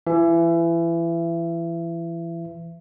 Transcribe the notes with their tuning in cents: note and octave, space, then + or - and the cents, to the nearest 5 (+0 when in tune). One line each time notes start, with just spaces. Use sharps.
E3 +25 E5 +30